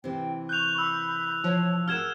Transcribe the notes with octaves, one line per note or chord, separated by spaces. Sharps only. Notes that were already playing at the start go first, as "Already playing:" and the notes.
C3 E3 G5
C#6 F#6 G6 F7
B5 E6
F3 C#5 A5
F#4 G#4 A#4 E6 F6 G#6 E7